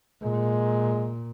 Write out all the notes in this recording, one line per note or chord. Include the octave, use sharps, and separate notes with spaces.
A#2 G#3